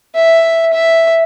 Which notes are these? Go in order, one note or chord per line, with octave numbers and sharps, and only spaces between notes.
E5
E5